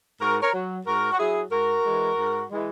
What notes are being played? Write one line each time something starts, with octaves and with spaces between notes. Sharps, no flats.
G#2 F#4 A#4
A#4 C#5
F#3
G#2 F#4 A#4
F#4
F#3 E4 G#4
G#2 F#4 A#4
E3 G#3
G#2
E3 G#3